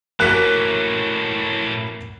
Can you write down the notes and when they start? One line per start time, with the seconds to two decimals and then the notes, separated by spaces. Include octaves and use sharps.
0.20 A2 A#3 C#4 F#4 F#6 B6